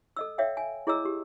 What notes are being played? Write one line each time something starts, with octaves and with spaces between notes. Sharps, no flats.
A4 D#5 E6
C#5 E5 F5 G5
G#5
E4 G#4 C#5 D#5 A#5 E6
G4